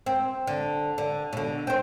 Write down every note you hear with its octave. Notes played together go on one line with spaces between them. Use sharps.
C4
D3
D3
B2 D3
C4 C5